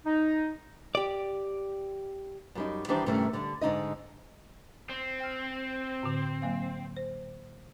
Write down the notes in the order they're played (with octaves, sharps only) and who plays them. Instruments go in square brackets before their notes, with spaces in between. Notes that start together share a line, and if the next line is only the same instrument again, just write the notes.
[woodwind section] D#4
[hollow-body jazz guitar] G4 D5
[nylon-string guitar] F#2 G3 D#4
D#3 E3 G3 D4 C5
G2 C3 D#3 E3 A3 C#4
D3 G3 D4
G#2 D3 D#4 D#5
[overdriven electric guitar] C4
[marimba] G5 F6
A2 D3
F#3 A#3 F5
C5